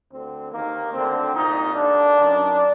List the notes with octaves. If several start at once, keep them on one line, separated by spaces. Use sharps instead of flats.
D2 D3 C4
D#2 D#3 A#3
D2 D3 C4
C2 A#2 D#4
D#2 D3 D4
F#2 D#3